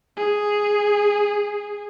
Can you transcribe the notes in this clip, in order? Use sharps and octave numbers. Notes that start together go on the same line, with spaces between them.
G#4